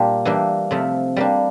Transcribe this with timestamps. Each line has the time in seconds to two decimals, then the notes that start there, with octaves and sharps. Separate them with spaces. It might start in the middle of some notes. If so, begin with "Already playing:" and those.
Already playing: A#2 G3 A#3 D4 G4
0.25 E3 G3 A#3 D4
0.71 C3 F3 A3
1.16 G3 A#3 D4